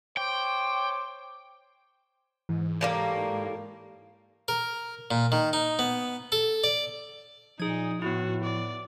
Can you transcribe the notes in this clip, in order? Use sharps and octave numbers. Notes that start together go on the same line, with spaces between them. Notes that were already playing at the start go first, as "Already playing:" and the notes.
C5 C#5 G5 D6
G#2 E3
A2 G3 A#3 F5
A#4
A#2
D#3
D#4
B3
A4
D5
A#2 F3 D#4 G#4 G#6
A2 B3 E4 F#4
D5